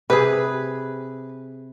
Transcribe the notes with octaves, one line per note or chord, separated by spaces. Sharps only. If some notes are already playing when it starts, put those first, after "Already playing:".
C3 G#4 B4